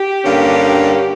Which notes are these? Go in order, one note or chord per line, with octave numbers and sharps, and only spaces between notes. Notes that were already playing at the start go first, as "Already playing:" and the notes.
Already playing: G4
G2 D3 A#3 C#4